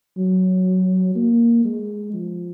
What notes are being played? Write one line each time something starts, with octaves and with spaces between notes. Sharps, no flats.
F#3
A#3
G#3
F3